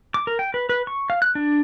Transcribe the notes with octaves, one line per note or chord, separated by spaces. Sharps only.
D6
A#4
G5
B4
B4
C#6
F5
F#6
D4